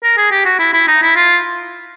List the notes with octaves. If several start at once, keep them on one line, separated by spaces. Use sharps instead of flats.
A#4
G#4
G4
F#4
E4
E4
D#4
E4
F4